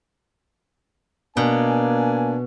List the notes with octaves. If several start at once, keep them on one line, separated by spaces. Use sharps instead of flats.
B2 A#3 D4 G#5